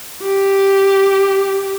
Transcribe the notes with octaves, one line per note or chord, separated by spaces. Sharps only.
G4